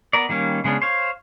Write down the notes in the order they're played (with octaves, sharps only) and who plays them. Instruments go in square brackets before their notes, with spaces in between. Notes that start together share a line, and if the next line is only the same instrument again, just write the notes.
[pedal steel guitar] B3 A#4 D5
D#3 G3 A#3 C#4
C#3 G#3 B3 C#4 D4
C5 C#5 F5